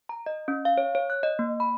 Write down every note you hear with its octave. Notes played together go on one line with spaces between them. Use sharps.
A#5
D#5
C#4
F5
C#5
C#5
F#6
D#5
A#3
B5